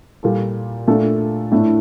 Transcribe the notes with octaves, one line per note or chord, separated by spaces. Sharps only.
A#2 G3 A#3 F4 A4
A#2 A3 D4 A4
A2 A3 D4